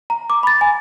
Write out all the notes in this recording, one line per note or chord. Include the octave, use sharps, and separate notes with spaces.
A#5
D6
B5 A6
G#5